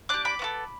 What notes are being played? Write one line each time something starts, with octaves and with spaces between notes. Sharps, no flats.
D4 G4 D6 F#6
B5 D6
B3 F#4 A4